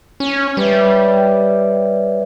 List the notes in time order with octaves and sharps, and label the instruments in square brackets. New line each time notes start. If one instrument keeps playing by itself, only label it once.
[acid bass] C#4
[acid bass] G3 [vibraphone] B4 C#5 E5